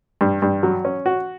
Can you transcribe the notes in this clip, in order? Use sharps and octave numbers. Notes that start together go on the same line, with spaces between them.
G2
G2
F#3
C#4
F#4